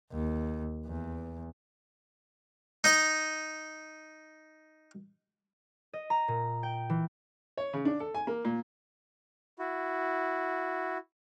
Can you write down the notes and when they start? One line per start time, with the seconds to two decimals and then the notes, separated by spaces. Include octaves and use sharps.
0.12 D#2
0.86 E2
2.84 D#4 D#5
5.93 D#5
6.10 A#5
6.28 A#2
6.63 G5
6.90 E3
7.57 C#5
7.73 C#3
7.85 D4
8.00 A4
8.15 G#5
8.27 A#3
8.45 A#2
9.59 E4 F#4